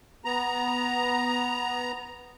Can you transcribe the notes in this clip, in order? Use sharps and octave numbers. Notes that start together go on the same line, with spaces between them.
B3 A#5